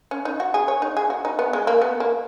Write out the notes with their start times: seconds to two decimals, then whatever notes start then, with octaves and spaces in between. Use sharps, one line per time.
0.11 C#4
0.25 D#4
0.40 F#4
0.54 G#4
0.68 C#5
0.82 D#4
0.97 G#4
1.10 F#4
1.25 D#4
1.39 B3
1.53 G#3
1.67 A#3
1.82 B3
2.00 A#3